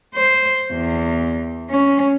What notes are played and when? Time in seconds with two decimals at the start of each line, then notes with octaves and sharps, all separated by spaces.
0.15 C5
0.72 E2
1.70 C#4